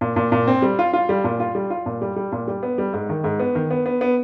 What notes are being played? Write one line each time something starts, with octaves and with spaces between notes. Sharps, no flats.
A#2
A#2
A#2
C4
G3
F4
F4
G3
A#2
F4
G3
F4
A#2
G3
G3
A#2
G3
B3
G3
G#2
D#3
G#2
B3
D#3
B3
B3
B3